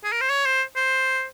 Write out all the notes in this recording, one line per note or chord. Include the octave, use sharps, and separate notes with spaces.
G#4
A#4
C5
C#5
C5
C5